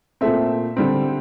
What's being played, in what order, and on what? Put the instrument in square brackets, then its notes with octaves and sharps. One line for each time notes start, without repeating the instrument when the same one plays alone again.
[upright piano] A#2 A3 C4 E5
D3 G3 C4